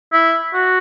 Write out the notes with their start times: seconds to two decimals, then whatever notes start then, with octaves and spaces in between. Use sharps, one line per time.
0.12 E4
0.54 F#4